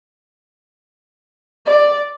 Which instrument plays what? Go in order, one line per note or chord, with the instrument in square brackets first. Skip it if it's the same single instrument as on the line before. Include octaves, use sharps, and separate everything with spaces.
[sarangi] D5